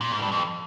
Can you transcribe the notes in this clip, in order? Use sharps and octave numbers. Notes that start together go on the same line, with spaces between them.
A#2
G#2
G2
F2